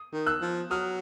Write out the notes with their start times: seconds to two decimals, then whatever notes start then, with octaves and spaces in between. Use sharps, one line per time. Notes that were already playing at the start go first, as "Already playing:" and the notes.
Already playing: D#6
0.13 D#3
0.26 E6 F#6
0.41 F3
0.70 F#3 D#6 F6